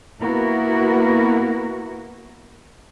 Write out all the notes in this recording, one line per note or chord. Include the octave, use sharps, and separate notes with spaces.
A#3 B3 E4 F#4 A#4